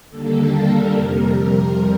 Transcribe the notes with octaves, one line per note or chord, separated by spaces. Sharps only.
D#2 D3 G3 A#3 A4
A#4
F2 C3 G3